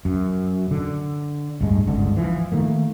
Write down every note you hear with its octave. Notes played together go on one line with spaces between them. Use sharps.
F#2
D3
D1 G2 G#3
G1 C#2 G#2 D3
E3 F3
D#3 A3 A#3